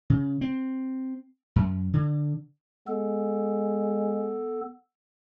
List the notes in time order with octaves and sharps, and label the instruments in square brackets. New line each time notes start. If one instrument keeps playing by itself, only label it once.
[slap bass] C#3
C4
F#2
D3
[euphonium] G#3 [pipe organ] B3 A4